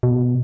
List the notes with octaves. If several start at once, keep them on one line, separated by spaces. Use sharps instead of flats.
B2